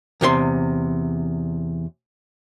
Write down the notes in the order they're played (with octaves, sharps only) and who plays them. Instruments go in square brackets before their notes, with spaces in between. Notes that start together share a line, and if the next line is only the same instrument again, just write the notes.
[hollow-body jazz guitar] E2 C3 G#4 C6